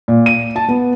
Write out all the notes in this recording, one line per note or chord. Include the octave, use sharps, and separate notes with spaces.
A#2
D#7
A5
B3